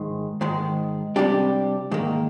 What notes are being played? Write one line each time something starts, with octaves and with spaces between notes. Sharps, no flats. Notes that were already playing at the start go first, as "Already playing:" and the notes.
Already playing: G#2 D#3 G#3
G#2 D#3 G#3
C3 G3 D4 G4
G#2 D#3 A#3